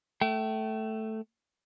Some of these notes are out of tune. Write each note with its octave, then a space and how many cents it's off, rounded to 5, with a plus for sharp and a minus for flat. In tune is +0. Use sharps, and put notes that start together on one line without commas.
A3 +0 G5 -35